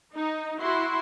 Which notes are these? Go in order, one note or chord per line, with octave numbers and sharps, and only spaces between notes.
D#4
E4 F#4 C6